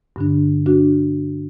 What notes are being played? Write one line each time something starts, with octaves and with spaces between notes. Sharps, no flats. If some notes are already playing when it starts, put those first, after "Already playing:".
G2 D3 D4
D4 F#4